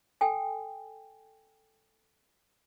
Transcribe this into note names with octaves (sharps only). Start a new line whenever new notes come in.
A4 G5 G#5